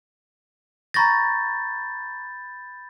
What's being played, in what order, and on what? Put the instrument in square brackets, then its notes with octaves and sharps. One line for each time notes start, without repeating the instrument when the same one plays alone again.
[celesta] A#5 C#6 A#6 [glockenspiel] B5 G6 A6